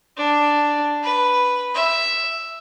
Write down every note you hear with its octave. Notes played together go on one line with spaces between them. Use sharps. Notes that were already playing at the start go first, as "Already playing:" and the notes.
D4
B4
E5